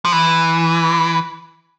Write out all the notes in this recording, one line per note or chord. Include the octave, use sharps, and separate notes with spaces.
F3
E3